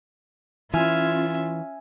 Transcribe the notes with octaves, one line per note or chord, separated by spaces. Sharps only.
E3 C#4 F4 E5 G#5 F6